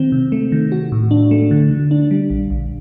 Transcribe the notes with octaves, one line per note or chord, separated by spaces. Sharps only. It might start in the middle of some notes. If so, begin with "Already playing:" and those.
Already playing: D#3 C4
C3
A3
D#3
F#4
A2
D4
A3
D3
D3
D4
G3
A#1
A#1